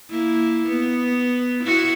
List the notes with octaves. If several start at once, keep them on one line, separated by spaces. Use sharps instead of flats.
A#3 E4
B3
E4 F#4